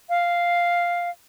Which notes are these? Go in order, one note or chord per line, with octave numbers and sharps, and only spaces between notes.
F5